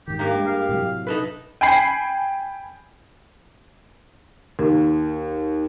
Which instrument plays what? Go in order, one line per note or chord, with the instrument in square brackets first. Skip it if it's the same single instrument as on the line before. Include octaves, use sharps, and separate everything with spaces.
[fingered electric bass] G#2 D#3 [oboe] G4
[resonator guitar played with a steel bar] G2 A#3 [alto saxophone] G4 [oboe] A#5
[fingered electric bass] G#3
[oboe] F5
[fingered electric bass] A2 C3 F#3
[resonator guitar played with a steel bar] D#4 A4 B4
[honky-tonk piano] G5 G#5 B5 C7
[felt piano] D#2